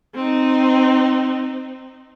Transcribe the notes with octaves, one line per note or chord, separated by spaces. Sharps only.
C4 D#4